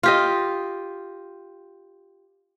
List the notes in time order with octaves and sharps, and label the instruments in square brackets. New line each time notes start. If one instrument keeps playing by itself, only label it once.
[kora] F4 G4 D#5